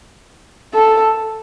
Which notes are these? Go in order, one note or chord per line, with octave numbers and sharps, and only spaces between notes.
A4